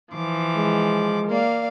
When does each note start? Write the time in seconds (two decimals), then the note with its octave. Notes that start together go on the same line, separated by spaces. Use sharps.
0.12 E3 F3 D6
0.56 G#3
1.27 A#3 D5 F5